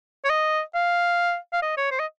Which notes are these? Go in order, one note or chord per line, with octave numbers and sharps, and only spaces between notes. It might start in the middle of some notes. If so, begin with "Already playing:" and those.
C#5
D#5
F5
F5
D#5
C#5
C5
D#5